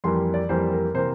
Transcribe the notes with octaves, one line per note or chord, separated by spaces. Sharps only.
F2 E3 G3 A#3 C6
D5
F2 E3 G3 A#3 C5
A#4
C3 E3 A#3 C5